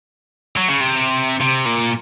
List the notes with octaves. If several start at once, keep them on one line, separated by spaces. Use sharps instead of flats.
F#3
C#3
C3
C3
A#2